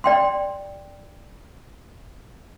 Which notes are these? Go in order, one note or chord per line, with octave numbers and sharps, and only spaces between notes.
D5 G5 C6